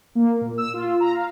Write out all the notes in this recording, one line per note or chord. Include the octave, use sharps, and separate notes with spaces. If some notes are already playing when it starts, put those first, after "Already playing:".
A#3
A#2
E6
F4
A#5
F5